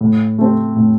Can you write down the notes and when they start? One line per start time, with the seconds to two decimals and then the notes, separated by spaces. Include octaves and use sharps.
0.01 A2
0.38 A3 C4
0.76 A2